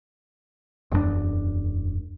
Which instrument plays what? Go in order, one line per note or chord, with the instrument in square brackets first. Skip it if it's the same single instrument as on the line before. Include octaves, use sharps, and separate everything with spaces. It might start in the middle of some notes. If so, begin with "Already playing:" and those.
[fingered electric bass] E1 F#2 G#3 D4